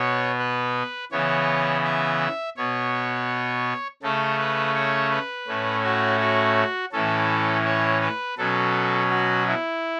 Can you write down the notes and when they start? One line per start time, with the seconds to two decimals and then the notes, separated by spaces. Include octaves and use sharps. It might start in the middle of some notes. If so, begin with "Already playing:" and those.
Already playing: B2 B3 C#5
0.39 B4
1.12 C#3 E3 B3 C#5
1.84 E5
2.57 B2 B3 C#5
4.02 C#3 A3 C#4 A4
4.39 B4
4.75 C#5
5.11 B4
5.48 A2 A3 C#4
5.84 F#4
6.20 F#4
6.92 A2 E3 C#4 A4
7.65 C#5
8.02 B4
8.37 B2 F#3 C#4 A4
9.11 F#4
9.47 E4